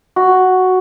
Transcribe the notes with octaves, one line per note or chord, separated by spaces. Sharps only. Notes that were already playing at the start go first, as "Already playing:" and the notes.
F#4